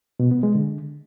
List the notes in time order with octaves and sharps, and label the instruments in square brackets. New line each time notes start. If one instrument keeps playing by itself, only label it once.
[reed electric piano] B2
B3
G#3
D3